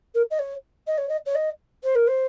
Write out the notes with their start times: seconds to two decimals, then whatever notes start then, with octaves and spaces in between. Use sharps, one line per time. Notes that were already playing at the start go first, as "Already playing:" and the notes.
0.14 A#4
0.30 D#5
0.39 C#5
0.87 D#5
0.97 C#5
1.09 D#5
1.25 C#5
1.35 D#5
1.83 C5
1.95 A#4
2.07 C5